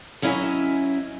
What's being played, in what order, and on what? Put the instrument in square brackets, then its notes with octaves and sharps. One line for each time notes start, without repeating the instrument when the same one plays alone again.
[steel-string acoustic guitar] F#3 C#4 E4 D#5 E5 G#5